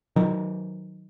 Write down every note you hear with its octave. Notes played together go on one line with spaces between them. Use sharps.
D#3 F#3